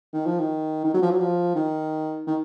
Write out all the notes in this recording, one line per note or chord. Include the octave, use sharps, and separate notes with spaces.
D#3
F3
D#3
D#3
F#3
F3
F#3
F3
D#3
D#3